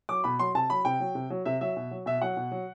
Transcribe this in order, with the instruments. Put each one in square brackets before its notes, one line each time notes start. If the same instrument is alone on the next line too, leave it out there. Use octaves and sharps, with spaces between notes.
[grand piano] F#3 D6
B2 B5
F#3 C6
C3 A5
F#3 B5
C3 G5
F#3
C3
F#3
C3 E5
F#3 E5
B2
F#3
B2 E5
F#3 F#5
B2
F#3